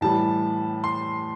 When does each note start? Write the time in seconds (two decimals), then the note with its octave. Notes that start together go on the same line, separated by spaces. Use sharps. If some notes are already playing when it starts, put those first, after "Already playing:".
0.01 A2 E3 G3 A5
0.84 C6